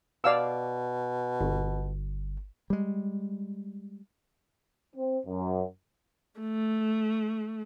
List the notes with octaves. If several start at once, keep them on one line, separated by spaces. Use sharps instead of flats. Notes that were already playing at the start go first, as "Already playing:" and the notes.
B2 D5 F5 E6
G1
G3 G#3
C4
F#2
A3